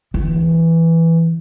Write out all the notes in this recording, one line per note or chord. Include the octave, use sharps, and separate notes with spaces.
E3